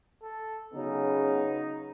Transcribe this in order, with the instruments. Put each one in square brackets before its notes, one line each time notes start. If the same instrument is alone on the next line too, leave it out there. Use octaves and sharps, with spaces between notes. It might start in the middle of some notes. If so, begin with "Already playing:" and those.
[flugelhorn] A4
[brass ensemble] C#3 F#3 B3 [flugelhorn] D#4